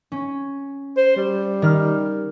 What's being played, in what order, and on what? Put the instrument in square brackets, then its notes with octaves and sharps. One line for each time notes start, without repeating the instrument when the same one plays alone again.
[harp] C#4
[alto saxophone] C5
G3
[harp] D#3 F6